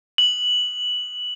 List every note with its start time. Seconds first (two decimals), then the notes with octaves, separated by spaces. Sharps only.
0.18 F#7